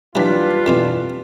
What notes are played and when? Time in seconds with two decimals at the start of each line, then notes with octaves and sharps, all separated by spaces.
0.15 D#2 E3 F#3 G3 D4 F4 B4 B6
0.66 F2 B2 E3